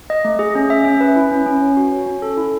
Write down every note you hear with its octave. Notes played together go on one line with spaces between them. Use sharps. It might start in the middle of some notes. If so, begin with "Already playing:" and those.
D#5
A3
G#4
C#4
E5
C#4
B4
E4
C#4
C#4
C#5
F#4
C#5
C#4
A4
E4